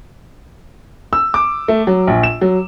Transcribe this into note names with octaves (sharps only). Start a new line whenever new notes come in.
E6
D6
A3
F#3
A#1
E7
F#3